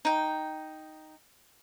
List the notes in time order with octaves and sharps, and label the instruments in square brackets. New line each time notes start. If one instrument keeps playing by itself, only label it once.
[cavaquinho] D#4 G5